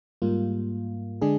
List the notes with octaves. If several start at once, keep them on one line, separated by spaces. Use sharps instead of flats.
G#2 G3 A#3 F4
D3 G#3 D4 G#4